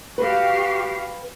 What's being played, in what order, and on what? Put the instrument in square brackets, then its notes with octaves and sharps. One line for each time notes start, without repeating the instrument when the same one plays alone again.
[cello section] F#4 G4 F5 [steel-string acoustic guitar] B4